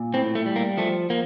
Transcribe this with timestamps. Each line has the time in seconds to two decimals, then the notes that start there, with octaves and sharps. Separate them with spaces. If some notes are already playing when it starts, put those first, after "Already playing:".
Already playing: A#2
0.14 A2 C4
0.35 A3
0.46 G3
0.56 A#3
0.77 F3 A3
1.10 F3 A#3